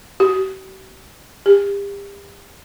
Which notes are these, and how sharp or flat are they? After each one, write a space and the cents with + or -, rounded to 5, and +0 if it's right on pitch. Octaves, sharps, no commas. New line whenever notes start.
G4 -45
G4 +35